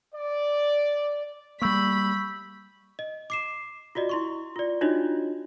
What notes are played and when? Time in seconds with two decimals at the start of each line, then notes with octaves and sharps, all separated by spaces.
0.15 D5
1.62 G3 A#3 B5 C#6 E6 G6
2.99 D#5
3.30 D6 C7 E7
3.95 F4 F#4 D5 D#5
4.09 E4 C6 C#6
4.56 F4 D5
4.81 D4 D#4 F4 F#4 C#5 D#5